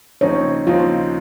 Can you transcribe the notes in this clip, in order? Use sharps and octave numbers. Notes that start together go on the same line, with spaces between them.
D#2 C#3 F3 C4 D#4 C#5
D#2 C#3 F3 C4 D#4 F4